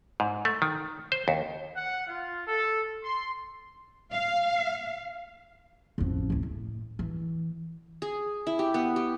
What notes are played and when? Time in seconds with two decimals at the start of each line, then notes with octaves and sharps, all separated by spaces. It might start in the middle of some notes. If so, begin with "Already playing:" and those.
0.20 G#2
0.45 A3
0.62 D#3
1.12 C5
1.28 D#2
1.76 F#5
2.06 F4
2.47 A4
3.01 C6
4.13 F5
5.98 A1 F2
6.30 D1 A2
6.43 A2
6.99 E3
8.02 G#4
8.47 E4
8.59 G4
8.74 B3
8.96 G4